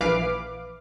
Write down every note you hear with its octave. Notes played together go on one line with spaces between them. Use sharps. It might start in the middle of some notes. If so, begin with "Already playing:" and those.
A#1 E3 B4 F5 D6